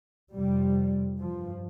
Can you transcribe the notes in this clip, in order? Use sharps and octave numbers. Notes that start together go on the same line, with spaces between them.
F2 C3 G3
G2 F3